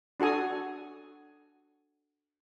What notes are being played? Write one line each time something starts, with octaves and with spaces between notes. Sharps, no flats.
D4 F#4 A4 G#5 D#6